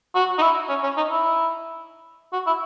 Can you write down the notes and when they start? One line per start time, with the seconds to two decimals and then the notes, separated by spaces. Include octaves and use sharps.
0.15 F#4
0.38 D#4
0.42 E4
0.69 C#4
0.83 C#4
0.97 D#4
1.11 E4
2.33 F#4
2.47 E4